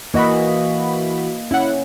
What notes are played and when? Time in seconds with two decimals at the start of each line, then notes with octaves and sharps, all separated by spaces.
0.14 E3 A#3 F#4 D#5 B5
1.51 C#4 E4 F#5